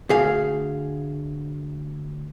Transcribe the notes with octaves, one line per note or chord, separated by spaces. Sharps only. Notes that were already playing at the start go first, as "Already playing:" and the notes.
D2 G#4 F5